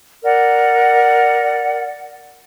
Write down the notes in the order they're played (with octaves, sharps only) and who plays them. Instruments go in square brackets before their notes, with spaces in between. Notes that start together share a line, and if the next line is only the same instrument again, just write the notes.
[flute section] A#4 D5 F#5